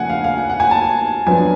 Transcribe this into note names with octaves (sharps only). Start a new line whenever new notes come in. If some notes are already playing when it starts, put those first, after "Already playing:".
Already playing: C#3 F3 A3 D4 F#5 G#5
F5
F5
F#5
F#5
G#5
A5
F#2 F3 B3 D4 G#5